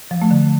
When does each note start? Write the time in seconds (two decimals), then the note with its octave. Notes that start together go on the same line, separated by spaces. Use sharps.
0.11 F3
0.22 A3
0.31 D3